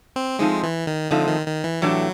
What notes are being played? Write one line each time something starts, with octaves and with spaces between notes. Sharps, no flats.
C4
F3 G#3 A3 C4 D#4
E3
D#3
D3 F3 A3 C4 D#4
D#3
D#3
E3
A2 E3 F#3 A3 D4 G4